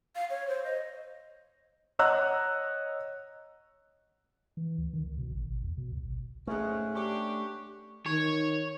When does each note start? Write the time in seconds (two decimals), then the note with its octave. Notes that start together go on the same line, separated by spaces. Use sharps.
0.16 F5
0.30 C#5
0.48 C5
0.64 D#5
1.99 C#5 D#5 F#5 A#5 E6 F#6
4.57 E3
4.78 D2
4.93 D#3
5.06 C#2
5.18 B2
5.32 A1
5.46 A1
5.63 E2
5.77 B2
5.92 C#2
6.05 G#1
6.47 G#2 A3 C#4 F#5
6.95 D4 G4 C#6
8.06 D#3 C#5